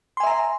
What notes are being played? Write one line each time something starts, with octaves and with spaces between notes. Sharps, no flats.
E5 G#5 A#5 C6